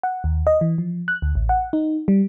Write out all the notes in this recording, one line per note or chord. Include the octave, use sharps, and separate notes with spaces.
F#5
D#2
D#5
E3
F3
F#6
D2
A1
F#5
D#4
G3